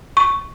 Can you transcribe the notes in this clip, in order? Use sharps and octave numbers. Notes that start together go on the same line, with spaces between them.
C#6